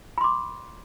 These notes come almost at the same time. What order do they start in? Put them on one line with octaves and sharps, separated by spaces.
B5 C6 D6